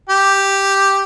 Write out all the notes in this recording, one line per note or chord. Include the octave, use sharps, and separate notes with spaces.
G4